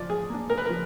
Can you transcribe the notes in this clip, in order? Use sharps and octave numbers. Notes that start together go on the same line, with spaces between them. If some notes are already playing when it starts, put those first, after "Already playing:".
Already playing: F3 D5
G#4
A#3 D4
A#4
B4
F3 A#4